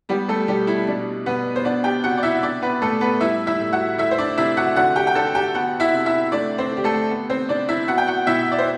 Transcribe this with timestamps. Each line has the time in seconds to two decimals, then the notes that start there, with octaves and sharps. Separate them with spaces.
0.09 G3 B3 G4
0.28 A3 A4
0.48 B2 G3 G4
0.67 E4
0.87 B2 D4
1.26 B2 B3 B4
1.56 C5
1.65 B3 D4 D5
1.84 G4 G5
2.04 C3 F#4 F#5
2.17 D5
2.23 E4 E5
2.43 B3 D4 D5
2.62 B3 B4
2.82 A2 A3 A4
3.01 B3 B4
3.21 G3 E4 E5
3.47 E4 E5
3.60 A2
3.73 F#4 F#5
3.98 A3 E4 E5
4.11 C5
4.18 D4 D5
4.37 C3 E4 E5
4.57 F#4 F#5
4.76 D3 F#4 F#5
4.96 G4 G5
5.07 G5
5.15 D3 A4 A5
5.35 G4 G5
5.54 B3 F#4 F#5
5.80 E4 E5
5.93 C3
6.06 E4 E5
6.32 A3 D4 D5
6.58 C4 C5
6.71 D3
6.77 G4
6.84 A3 A4
7.10 B3
7.30 C4 C5
7.49 C3 D4 D5
7.68 E4 E5
7.88 B3 F#4 F#5
7.98 G5
8.07 F#4 F#5
8.27 B2 E4 E5
8.52 D5
8.58 C5